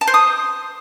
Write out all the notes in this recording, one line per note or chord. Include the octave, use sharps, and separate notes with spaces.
A5
C5
D#6